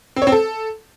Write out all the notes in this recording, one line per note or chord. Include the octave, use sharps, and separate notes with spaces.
C4
C#5
C4
A4